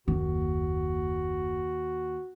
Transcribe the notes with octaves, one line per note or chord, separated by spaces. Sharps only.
F#1 D#2 F#4